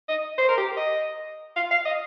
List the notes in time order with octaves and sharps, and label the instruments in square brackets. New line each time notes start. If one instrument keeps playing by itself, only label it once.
[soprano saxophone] D#5
C5
A#4
G4
D#5
F5
F5
D#5